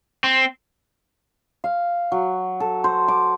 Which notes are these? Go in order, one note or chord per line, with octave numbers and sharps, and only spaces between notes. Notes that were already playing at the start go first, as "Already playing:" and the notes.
C4
F5
F#3
A4
C5
D6